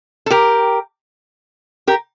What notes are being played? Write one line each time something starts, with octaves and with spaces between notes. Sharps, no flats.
A4
G4 A#4
G4 A#4